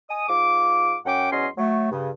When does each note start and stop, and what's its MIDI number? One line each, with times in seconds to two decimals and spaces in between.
0.09 0.27 75
0.09 0.27 80
0.09 0.27 87
0.29 0.96 44
0.29 0.96 65
0.29 0.96 86
1.06 1.30 42
1.06 1.30 61
1.06 1.30 78
1.06 1.30 79
1.06 1.30 86
1.32 1.47 40
1.32 1.47 54
1.32 1.47 61
1.32 1.47 75
1.32 1.47 84
1.57 1.88 54
1.57 1.88 57
1.91 2.10 43
1.91 2.10 49